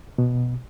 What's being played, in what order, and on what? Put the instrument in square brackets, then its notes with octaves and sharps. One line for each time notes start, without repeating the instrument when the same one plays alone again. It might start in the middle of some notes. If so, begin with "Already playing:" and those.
[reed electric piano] B2